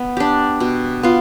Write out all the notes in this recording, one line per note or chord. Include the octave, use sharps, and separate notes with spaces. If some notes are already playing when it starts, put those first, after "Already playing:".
Already playing: B3
D4 G4
B2
B3 F4